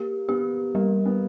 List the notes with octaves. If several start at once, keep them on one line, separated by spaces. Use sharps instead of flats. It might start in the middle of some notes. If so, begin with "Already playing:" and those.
Already playing: A#3 G4
B3 G4
G3 A#3
B3